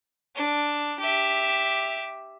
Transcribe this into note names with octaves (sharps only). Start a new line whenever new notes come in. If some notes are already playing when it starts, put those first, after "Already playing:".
D4
G4 E5